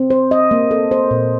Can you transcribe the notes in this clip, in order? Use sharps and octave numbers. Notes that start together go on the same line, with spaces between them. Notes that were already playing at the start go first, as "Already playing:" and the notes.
Already playing: C4
C5
D#5
A#3
A4
C5
A#2